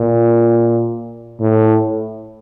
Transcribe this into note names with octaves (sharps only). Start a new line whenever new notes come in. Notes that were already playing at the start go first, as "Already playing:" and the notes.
Already playing: A#2
A2